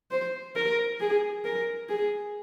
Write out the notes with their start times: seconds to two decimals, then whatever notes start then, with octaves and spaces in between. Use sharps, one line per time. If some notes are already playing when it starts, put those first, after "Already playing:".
0.11 C5
0.56 A#4
1.00 G#4
1.45 A#4
1.89 G#4